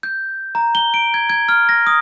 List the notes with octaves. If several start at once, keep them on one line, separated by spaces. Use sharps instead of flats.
G6
A#5
G7
D7
G#6
G#6
F6
A#6
D#6